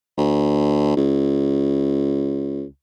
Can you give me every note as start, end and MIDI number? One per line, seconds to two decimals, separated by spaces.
0.18 0.93 38
0.97 2.64 37